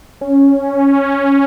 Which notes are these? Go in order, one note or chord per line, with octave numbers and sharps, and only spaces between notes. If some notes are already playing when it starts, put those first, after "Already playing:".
C#4